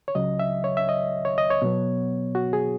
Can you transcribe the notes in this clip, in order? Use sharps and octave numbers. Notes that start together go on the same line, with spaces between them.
C#5
C#2 C#3 F#3 D#5
E5
C#5
E5
D#5
C#5
D#5
C#5
B2 F#3 B3
F#4
G#4